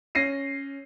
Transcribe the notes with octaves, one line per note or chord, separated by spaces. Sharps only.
C#4 A#6 C7 D#7